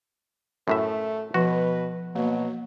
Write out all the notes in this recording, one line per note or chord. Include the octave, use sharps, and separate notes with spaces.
F#2 A2 A3 E5
B2 F3 F#4 B4
B2 F#3 A#3